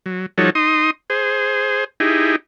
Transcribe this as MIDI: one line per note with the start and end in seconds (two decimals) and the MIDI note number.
0.06 0.26 54
0.38 0.50 53
0.38 0.50 55
0.38 0.50 63
0.38 0.50 66
0.38 0.50 69
0.38 0.50 73
0.55 0.91 63
0.55 0.91 84
0.55 0.91 87
1.10 1.84 68
1.10 1.84 72
2.00 2.36 63
2.00 2.36 64
2.00 2.36 67
2.00 2.36 68